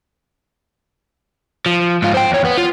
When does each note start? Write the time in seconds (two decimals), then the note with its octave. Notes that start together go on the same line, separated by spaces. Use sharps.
1.66 F3
2.02 G#2 F4
2.14 C5 G5
2.31 E2 C#5
2.44 B3
2.58 F4